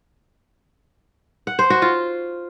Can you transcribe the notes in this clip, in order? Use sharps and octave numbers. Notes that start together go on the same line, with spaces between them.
F#5
C5
F#4
F4